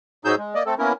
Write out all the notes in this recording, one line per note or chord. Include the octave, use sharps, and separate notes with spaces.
G#2 F#3 D#4 G#4 E6 G6
G#3
A#3 D5 D#5
A3 C4 A4
A#3 B3 C#4 E4 A#4